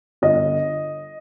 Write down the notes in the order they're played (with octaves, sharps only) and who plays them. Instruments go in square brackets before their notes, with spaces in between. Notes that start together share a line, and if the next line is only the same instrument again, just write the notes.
[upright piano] G1 D#5